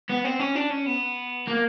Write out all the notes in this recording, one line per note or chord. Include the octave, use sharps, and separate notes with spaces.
B3
C4
C#4
D4
C#4
B3
A#3